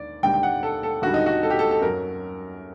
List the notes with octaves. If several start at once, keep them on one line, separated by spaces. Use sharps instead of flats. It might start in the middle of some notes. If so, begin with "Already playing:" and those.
Already playing: D#2 D3 D5
D#2 D3 G3 G5
G5
F#5
A4
A4
D#2 D3 G3 F#4
D#4
F#4
A4
G4
A4
A4
F#2 F#3 A#4